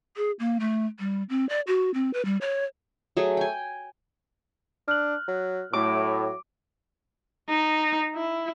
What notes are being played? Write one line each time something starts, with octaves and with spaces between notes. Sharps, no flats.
G#4
A#3
A3
G3
C4
D5
F#4
C4
B4
G3
C#5
F#3 A3 G#4
G5 G#5
D4 F6 F#6 F#7
F#3
A2 F#3 D6
D#4
E4